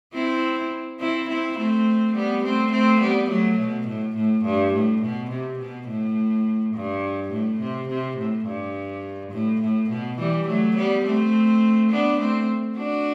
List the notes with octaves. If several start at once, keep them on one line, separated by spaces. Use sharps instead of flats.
C4 E4
C4 E4
C4 E4
A3 C4
G3 B3
A3 C4
A3 C4
G3 B3
F#3 A3
B2
A2
A2
G2
A2
B2
C3
B2
A2
G2
A2
C3
C3
A2
G2
A2
A2
B2
E3 G3
F#3 A3
G3 B3
A3 C4
B3 D4
A3 C4
D4 F#4